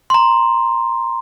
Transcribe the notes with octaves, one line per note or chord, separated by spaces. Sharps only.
A#5 C6